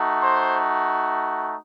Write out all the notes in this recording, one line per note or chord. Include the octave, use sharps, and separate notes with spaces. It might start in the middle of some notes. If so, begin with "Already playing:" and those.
Already playing: A3 D#4 F#4
C5 C6